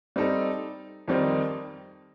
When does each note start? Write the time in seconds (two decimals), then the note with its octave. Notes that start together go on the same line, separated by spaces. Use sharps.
0.16 G3 C4 D#4 A4
1.08 F2 D#3 G3 C4 D#4